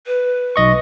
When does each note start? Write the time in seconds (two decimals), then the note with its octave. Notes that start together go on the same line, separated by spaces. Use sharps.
0.07 B4
0.56 B1 D#5 C#6